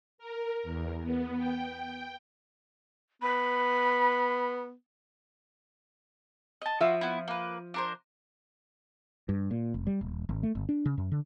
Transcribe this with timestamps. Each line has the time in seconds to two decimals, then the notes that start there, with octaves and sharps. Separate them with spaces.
0.18 A#4
0.63 E2
1.02 B3
1.37 G5
3.22 B3 B5
6.62 D#5 A5
6.80 F3 F4 F#4 E5
7.01 B3 E4
7.28 A#3 B4
7.74 D4 A#4 C5
9.29 G2
9.51 A#2
9.74 F1
9.87 G3
10.01 D#1
10.29 G#1
10.43 A3
10.55 G1
10.69 D4
10.86 C#3
10.98 F#2
11.12 D3